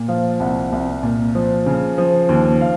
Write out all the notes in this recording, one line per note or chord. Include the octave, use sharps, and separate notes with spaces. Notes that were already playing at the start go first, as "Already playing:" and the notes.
Already playing: A#2
F3 F5
C2 F#5
C2
A#2
F3
C#3
F3
D#2
F5